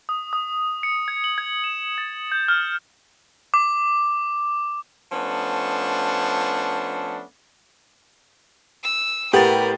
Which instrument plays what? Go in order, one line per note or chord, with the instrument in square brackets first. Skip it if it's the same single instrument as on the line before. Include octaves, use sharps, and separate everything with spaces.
[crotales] D#6
D#6
C#7
G#6
F#7
G#6
E7
A6
G6
F6
D6
[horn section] F3 A3 B3 C#4 D4
[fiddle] E6
[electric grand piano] A2 A6 [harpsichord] B3 [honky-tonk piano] G4 [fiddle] A#4